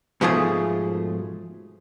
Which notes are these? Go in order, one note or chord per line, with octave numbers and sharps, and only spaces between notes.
G#2 B2 F3 A3 G#4